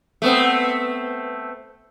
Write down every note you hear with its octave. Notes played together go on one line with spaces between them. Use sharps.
A3 B3 C4